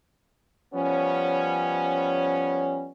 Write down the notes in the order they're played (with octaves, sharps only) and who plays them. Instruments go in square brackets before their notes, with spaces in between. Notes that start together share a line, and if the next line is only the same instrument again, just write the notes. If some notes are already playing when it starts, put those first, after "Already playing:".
[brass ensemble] F3 G3 B3 C#4